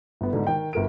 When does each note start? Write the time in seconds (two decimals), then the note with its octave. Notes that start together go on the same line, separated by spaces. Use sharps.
0.21 G1 B3
0.33 G#2 B2 D3
0.47 D#3 G5
0.73 G1 A#4 D7